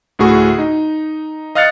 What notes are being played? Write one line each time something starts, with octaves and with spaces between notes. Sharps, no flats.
D2 A2 F#4 G#4 C#6
D#4
D#5 F5 F6 F#6 A6 C#7